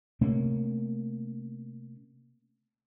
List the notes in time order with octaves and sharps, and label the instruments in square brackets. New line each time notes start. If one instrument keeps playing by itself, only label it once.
[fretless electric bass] C3 A3 A#3 C#4